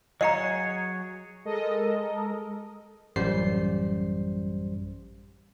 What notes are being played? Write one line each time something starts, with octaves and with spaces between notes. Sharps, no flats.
F#3 G#4 C#5 D#5 F5 A#5
G#3 A4 A#4 D#5
A1 F#2 G3 C5 C7